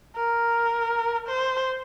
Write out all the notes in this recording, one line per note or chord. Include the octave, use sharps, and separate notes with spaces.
A#4
C5